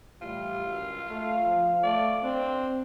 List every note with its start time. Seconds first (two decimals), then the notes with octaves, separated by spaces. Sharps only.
0.22 A2 E3 G3 F4
0.65 G1 C#2 F#2
1.10 A3 F5
1.47 F3
1.83 A3 D5
2.24 C4 D4